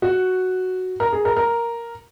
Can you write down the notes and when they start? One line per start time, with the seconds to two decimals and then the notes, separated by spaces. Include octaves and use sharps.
0.02 F#4
1.00 A#4
1.12 G#4
1.25 A#4
1.36 A#4